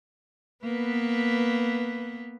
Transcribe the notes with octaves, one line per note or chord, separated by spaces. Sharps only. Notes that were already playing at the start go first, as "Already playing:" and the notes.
A#3 B3 B4